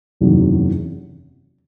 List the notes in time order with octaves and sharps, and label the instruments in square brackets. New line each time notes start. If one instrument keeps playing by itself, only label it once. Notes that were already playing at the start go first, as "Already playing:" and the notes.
[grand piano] F#1 E2 C3 D#3 F#3